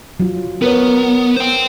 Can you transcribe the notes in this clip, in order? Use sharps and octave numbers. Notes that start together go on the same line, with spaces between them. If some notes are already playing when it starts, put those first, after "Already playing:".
F#3 F4
B3 A#4 B4 C#5
C5 G5